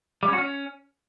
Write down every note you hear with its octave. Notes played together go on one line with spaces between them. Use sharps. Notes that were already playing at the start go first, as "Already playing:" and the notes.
G3
C#4
F#4
C#4